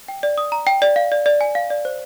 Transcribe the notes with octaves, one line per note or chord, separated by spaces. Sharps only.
G5
D5
D#6
A#5
G5
D5
F5
D5
D5
G#5
F5
D5
C5